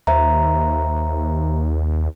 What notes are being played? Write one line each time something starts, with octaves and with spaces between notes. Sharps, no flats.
D#2 C5 E5 A#5